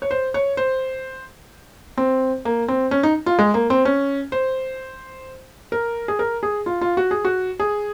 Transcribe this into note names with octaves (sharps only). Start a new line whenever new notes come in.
C#5
C5
C#5
C5
C4
A#3
C4
C#4
D#4
F4
G#3
A#3
C4
C#4
C5
A#4
G#4
A#4
G#4
F4
F4
F#4
G#4
F#4
G#4